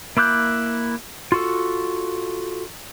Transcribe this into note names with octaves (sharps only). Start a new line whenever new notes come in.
A#3 E4 D6 F#6 G6
F4 F#4 A4